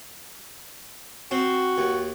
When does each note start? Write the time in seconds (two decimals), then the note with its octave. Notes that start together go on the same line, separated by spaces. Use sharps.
1.31 C4 F#4
1.78 D#2